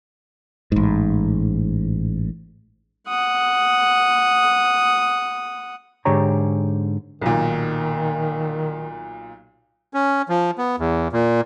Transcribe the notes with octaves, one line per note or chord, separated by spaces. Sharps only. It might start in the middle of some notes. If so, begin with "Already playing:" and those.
A1 G#2
F#5 D#6
G#2 D3 G4 C#5 A#5
B1 A#2 D#3
C#4
F3
B3
E2
A#2